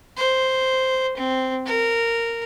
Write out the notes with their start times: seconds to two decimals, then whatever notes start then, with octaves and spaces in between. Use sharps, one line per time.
0.17 C5
1.17 C4
1.66 A#4